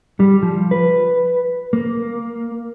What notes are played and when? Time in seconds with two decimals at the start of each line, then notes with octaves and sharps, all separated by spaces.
0.20 G3
0.43 F3
0.71 B4
1.73 A#3